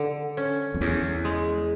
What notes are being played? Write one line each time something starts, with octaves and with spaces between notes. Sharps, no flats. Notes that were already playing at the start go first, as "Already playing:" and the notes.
Already playing: D3
C#4
F2
E2 C#4
G#3